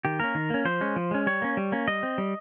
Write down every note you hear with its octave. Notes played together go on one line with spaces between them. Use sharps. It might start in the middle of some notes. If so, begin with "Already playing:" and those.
D#3 G4
A#3 C#4 A#4
D#3
A#3 C#4
F3 C5
G#3 C#4
F3
G#3 C#4
G3 C#5
A#3 C#4
G3
A#3 C#4
G3 D#5
C4
G3